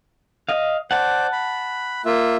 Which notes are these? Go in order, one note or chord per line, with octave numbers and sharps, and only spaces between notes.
D#5 F5
C5 D5 F#5 A5
B5
A#3 F4 E5